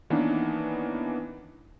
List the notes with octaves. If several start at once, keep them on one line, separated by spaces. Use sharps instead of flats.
D#3 E3 A#3 B3 C#4 D4